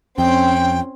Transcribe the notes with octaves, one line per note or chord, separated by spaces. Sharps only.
F2 C4 C#4 G5